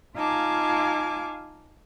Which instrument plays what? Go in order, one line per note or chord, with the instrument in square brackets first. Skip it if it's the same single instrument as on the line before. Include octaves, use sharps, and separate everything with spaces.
[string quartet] D#4 F4 F5 G#5 A5 D6